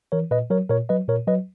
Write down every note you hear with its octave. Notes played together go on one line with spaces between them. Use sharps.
E3 A#4 C#5
A#2 B4 D#5
F#3 A#4 C#5
A#2 A#4 C#5
F#3 B4 D#5
A#2 A#4 C#5
F#3 B4 D#5